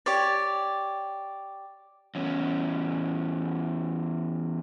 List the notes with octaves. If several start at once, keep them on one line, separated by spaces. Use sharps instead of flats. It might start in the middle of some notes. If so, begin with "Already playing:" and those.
G4 C#5 D5
E2 C#4